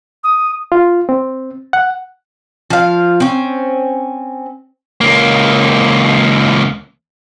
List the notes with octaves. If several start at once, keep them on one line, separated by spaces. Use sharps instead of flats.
D#6
F4
C4
F#5
F3 F5
C4 C#4
C#2 A#3